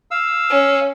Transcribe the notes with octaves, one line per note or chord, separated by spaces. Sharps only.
F5 E6
C#4